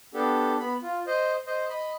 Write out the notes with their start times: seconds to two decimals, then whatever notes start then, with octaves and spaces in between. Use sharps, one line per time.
0.14 B3 D4 G4 A4
0.60 B3 B5
0.82 F4
1.07 C5 D#5
1.47 C5 D#5
1.70 D#5 B5